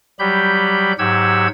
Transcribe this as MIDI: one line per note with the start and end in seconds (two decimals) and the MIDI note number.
0.19 0.93 54
0.19 0.93 55
0.19 0.93 67
0.19 0.93 83
0.19 0.93 91
0.99 1.47 44
0.99 1.47 54
0.99 1.47 67
0.99 1.47 78
0.99 1.47 88
0.99 1.47 92